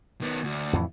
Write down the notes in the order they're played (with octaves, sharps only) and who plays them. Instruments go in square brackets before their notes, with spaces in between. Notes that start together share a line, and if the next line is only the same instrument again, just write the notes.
[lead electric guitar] D#3 B3
D2
[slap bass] F2 A2 E3